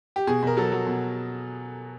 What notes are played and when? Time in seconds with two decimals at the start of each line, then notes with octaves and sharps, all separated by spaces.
0.16 G4
0.27 B2 G#4
0.43 B2 A#4
0.57 F#3 A4
0.72 F#3
0.87 B2